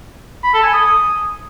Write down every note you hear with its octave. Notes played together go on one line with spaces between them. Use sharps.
B5
A4
G#5
D#6